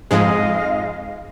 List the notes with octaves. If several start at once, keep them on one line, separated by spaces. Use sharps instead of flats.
F2 G#2 G#3 D#5 F5